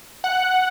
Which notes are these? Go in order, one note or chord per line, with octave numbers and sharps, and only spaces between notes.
F#5